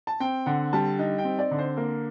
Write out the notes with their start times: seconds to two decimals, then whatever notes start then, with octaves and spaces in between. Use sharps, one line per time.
0.07 A5
0.20 C4 G5
0.46 D3 F#5
0.73 G3 A5
0.99 D#4
1.18 G5
1.24 C4
1.39 D5
1.51 D3
1.58 C5
1.77 A#3 A#4